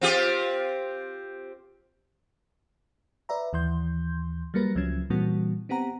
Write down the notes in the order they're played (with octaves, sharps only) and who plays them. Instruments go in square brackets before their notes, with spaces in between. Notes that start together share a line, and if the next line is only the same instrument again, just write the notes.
[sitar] C4 F4 G4
[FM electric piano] B4 D5 E5 A#5
D#2 E3 C6 G6
F#3 G3 A#3 A#4 B4 A#6
C#2 F3 F#3 C#4 G#6
A#2 E3 G3 A#3 C4 F#4
B3 C4 G4 F#5 A#5